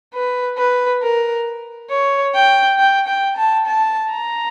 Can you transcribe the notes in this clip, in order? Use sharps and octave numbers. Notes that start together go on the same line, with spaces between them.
B4
B4
A#4
C#5
G5
G5
G5
A5
A5
A#5